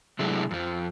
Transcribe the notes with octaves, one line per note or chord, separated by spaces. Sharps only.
C3 F#3 G#3 A3 D4 E4
F2 F3